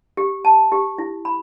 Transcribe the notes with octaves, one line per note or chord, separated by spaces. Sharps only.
G4
A5
G4
E4
B5